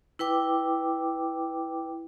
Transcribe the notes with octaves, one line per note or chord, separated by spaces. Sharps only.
E4 B4 G5 D6